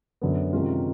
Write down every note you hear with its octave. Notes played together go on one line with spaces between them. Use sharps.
F#2 D3 F#3 B3
C3 D#3 G#3 C#4 F4